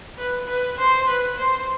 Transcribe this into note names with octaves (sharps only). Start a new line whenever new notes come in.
B4
B4
C5
B4
C5